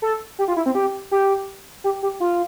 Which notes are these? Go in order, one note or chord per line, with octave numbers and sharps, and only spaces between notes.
A4
G4
F4
E4
C4
G4
G4
G4
G4
F4